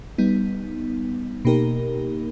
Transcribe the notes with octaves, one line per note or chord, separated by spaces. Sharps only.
G3 B3 D#4
B2 A#3 D#4 G4 A#4